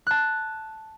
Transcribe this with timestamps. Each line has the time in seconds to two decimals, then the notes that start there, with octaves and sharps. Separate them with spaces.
0.07 A5 F#6